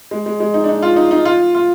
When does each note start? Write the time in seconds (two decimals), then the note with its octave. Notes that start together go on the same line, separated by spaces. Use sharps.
0.11 G#3
0.26 G#3
0.40 G#3
0.54 D#4
0.64 D4
0.68 D#4
0.82 F4
0.96 D#4
1.11 D#4
1.25 F4
1.55 F4